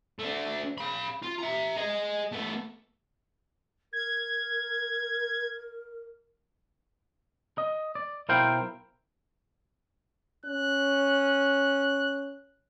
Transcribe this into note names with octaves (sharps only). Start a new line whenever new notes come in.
A3 D4
F5 B5
F4
E5 A#5
G#4 D#5
A3 B3
A#4 G#6
D#5
D5
B1 E4 A#4 C5 F5 G5
C#4 F#6